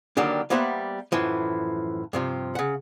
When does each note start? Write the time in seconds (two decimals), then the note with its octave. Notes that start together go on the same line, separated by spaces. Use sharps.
0.17 D3 D#3 F#3 G3 A#3 D4
0.50 G3 A#3 B3 C5 E5 F#5
1.12 F#2 A2 E3 F3
2.13 G2 C3 F3
2.55 C#3 F#5